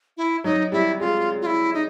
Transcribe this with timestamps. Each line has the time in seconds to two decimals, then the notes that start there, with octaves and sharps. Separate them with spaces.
0.17 E4
0.44 F#3 D#4
0.72 G3 E4
1.00 G#3 F4
1.42 F4
1.46 E4
1.74 D#4